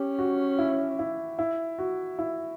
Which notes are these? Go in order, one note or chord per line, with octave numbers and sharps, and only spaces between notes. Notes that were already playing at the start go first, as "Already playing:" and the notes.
Already playing: C#4 G4
F#4
E4
E4
E4
F#4
E4